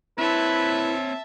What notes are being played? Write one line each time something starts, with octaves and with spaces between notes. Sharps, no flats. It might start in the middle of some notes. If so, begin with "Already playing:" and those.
C4 E4 B4 C#5 E5 A5